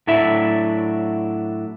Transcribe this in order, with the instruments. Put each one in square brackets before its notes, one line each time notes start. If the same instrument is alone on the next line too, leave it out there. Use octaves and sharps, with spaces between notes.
[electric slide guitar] A2 F#3 D4 E4 E5